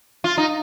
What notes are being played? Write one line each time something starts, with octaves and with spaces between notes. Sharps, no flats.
F4
D#4